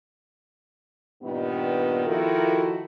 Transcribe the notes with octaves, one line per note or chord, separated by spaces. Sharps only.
G2 A#2 D#3 B3
D#3 F3 E4 F#4 A4 A#4